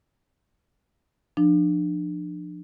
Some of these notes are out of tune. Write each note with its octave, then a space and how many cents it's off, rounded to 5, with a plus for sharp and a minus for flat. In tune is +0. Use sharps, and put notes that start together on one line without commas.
F3 +0 D4 +30